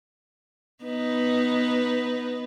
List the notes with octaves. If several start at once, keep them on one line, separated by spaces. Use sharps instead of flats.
B3 D#4 B4